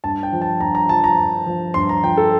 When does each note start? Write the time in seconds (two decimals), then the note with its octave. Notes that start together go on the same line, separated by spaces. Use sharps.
0.04 G2 A5
0.23 G5
0.32 F3
0.42 A5
0.60 G2 A#5
0.75 A#5
0.89 F3 A5
1.04 A#5
1.18 G2
1.46 F3
1.74 G2 C6
1.89 A#5
2.03 F3 G5
2.17 A4